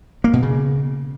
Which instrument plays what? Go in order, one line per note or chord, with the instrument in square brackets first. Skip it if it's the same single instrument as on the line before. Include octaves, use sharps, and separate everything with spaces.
[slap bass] A#3
B2
C#3